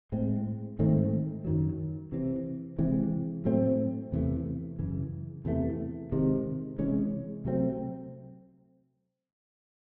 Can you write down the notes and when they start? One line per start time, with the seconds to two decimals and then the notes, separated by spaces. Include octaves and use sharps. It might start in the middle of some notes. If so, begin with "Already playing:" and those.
0.12 A2 G#3 C4
0.79 G#2 D#3 A3 C4
1.45 F#2 D#3 F#3
2.12 C3 E3 C4
2.78 C3 E3 G#3 C4
3.45 A2 F#3 A3 C4
4.12 E2 C3 E3 A3
4.79 F#2 C#3 E3
5.45 E2 C3 E3 A3
6.12 C3 D#3 G#3
6.78 C3 E3 G#3 C#4
7.45 C3 F#3 A3 C4